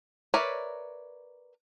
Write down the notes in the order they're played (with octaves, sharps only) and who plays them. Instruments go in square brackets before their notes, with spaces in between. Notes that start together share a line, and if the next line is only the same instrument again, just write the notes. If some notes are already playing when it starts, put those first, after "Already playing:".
[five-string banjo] A#4 B4 C#5 D5 E5